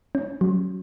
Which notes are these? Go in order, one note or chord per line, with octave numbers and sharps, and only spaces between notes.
C#4
F#3